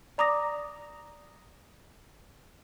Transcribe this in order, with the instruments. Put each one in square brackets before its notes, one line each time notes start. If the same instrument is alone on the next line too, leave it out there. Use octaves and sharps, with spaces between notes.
[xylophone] D5 A#5 D6 D#6 A#6